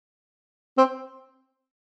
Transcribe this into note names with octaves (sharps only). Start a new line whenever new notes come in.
C4